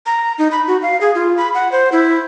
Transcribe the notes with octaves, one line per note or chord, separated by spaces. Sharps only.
A#5
D#4
B5
F#4
F5
G#4
F4
B5
F#5
C5
E4